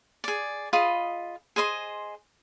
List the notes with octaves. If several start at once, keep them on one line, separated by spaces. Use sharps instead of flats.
G#4 D5
F4 G#4 D#5 B5
G#4 C5 D#5 C6